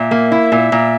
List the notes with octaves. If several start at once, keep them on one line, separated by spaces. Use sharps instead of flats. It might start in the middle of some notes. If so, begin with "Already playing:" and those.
Already playing: A#2 E5
A#3
E4
A#2
A#2